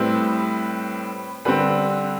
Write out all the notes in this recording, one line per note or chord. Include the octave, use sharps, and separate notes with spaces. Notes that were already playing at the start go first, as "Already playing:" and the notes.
Already playing: A2 G3 C4 E4 B4
D3 G3 C4 B4